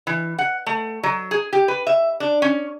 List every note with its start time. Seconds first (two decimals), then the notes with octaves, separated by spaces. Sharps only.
0.07 E3
0.38 F#5
0.66 A3
1.03 F#3
1.31 G#4
1.53 G4
1.68 B4
1.87 E5
2.20 D4
2.42 C#4